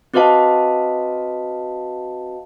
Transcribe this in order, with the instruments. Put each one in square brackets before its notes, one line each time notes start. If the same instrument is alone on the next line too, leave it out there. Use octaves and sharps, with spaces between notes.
[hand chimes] C4 F#4 B4 D#5 F5 A5